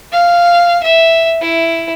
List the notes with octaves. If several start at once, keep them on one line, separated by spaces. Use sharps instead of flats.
F5
E5
E4